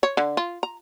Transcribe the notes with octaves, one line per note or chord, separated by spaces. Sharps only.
C#5
D3
F4
A#5